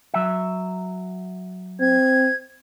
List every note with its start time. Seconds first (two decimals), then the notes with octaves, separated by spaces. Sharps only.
0.14 F#3 E5
1.80 C4 G#6